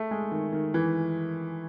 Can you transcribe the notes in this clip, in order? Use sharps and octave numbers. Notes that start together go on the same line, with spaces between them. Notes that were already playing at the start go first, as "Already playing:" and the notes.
Already playing: A3
G#3
D#3
D#3
E3